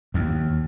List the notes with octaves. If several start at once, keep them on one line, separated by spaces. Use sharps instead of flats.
D#2